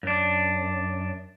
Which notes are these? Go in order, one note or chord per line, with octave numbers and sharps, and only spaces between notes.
F#2 D4